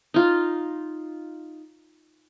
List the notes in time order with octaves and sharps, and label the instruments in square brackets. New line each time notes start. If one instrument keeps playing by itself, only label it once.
[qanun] D#4 F4